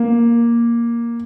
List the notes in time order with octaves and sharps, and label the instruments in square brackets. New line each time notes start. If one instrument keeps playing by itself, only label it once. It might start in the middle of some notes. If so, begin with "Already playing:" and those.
Already playing: [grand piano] A#3